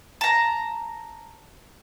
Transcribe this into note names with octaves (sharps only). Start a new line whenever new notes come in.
A5 A#5